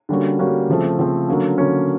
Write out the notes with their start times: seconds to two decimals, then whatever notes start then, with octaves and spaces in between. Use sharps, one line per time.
0.09 D3 G3 A#3 C#4 F#4
0.39 D3 G3 A#3 C#4 F#4
0.69 C#3 F3 A3 C4
0.98 C#3 F3 A3 C4
1.28 D3 F#3 A#3 C#4
1.58 D3 F#3 A#3 C#4